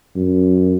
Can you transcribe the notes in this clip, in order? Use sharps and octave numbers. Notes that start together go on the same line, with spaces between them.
F#2